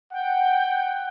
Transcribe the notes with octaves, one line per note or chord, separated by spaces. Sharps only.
F#5 G5